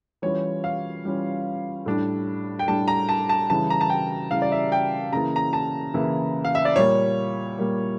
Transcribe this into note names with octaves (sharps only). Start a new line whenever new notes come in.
E3 G3 C#4 F4 C#5
F5
E3 G3 C#4 F4
A2 G3 D4
G5
A2 G3 D4 A5
A#5
A5
A5
C#3 E3 G3 C#4 E4 A5
A#5
A5
G5
C#3 E3 G3 C#4 E4 F5
D5
E5
G5
C#3 E3 A#3 E4 A#5
A#5
A5
C#3 E3 A#3 E4
F5
E5
D5
A#2 G3 A#3 C#5
A#2 G3 A#3